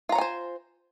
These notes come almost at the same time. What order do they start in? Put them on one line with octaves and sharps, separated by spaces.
F4 A#5 C#5 G#5 C5